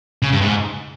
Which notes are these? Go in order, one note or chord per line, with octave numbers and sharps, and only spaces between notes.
C#3
G2
G#2